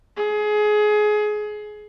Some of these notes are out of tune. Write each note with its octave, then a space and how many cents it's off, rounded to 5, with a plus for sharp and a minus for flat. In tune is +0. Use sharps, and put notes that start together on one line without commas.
G#4 +25